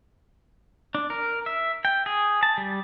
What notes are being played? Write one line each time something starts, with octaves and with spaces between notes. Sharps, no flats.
D4
A#4
E5
G5
G#4
A5
G3